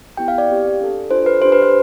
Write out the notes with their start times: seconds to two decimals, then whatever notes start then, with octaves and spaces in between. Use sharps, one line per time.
0.17 B3 E4 G4 G5
0.28 F5
0.38 D5
0.49 C4 G4
0.80 D4 A4
1.11 D4 F4 A4 C5
1.26 B4
1.42 D4 G4 C5
1.52 B4
1.62 C5